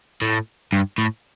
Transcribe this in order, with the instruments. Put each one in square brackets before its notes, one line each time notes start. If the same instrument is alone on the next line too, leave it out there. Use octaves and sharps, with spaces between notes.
[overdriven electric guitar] A2
G2
A2